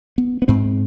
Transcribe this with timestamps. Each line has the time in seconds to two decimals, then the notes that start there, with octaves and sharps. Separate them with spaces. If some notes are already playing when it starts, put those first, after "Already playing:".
0.18 B3
0.42 B3
0.48 G#2 C4